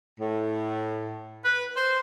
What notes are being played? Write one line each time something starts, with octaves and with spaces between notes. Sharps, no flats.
A2
B4
C5